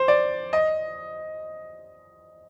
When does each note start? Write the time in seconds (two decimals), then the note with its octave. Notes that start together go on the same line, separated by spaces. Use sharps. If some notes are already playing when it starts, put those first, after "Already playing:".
Already playing: C5
0.08 D5
0.53 D#5